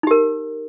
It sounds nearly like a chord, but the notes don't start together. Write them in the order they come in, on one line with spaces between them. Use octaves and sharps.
D#4 G4 A#4